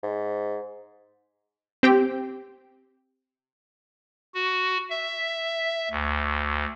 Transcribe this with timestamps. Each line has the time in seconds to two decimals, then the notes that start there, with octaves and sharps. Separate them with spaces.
0.03 G#2
1.83 C4 G4 G5
4.34 F#4
4.90 E5
5.91 D2